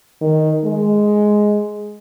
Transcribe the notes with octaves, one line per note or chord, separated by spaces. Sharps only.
D#3
G#3